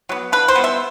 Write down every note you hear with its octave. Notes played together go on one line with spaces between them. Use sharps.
F#3 B3
D3 B4
C5
G3 B3
E5